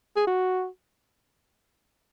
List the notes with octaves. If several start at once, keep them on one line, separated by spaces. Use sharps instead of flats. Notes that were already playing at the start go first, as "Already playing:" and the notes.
G#4
F#4